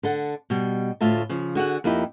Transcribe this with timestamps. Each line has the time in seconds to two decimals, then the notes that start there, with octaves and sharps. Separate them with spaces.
0.03 D3 A4 F#5
0.50 B2 G3
1.01 D2 A2 F4 E5 A5
1.29 C#3 F3
1.55 D3 F#4 G#4 F#5
1.84 F2 A#3 D#4 E4 G4